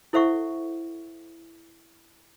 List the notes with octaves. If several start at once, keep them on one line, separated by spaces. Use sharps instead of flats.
E4 A4 C5 E5 F#5 C#6